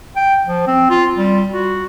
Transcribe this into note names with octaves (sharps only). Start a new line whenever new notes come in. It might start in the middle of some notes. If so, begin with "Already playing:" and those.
G5
F3
C4
F4
G3
F#4